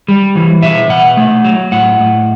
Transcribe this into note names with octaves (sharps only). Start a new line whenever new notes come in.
G3
E3
B2 E5
B2 F#5
A3
F#3
A2 F#5
A2